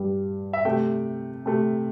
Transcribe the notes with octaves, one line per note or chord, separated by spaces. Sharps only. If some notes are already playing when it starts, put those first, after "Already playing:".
Already playing: G2 G3
E5
C3 A3 G5
C3 A3